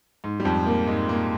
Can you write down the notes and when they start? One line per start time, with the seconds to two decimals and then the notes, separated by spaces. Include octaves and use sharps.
0.24 G#2
0.40 G3
0.45 F2 F3
0.66 A#2 A#3
0.87 G#2 G#3
1.08 A#2 A#3